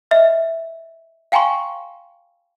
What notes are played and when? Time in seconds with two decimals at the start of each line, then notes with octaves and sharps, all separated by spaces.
0.11 D#5 E5 F6
1.32 F5 G5 G#5 A#5 C6 C#6